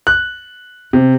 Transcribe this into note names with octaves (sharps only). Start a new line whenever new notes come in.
F#6
C3